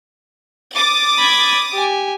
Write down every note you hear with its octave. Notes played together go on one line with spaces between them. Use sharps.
D6 D#6 A6
B5 G#6
G4 G#5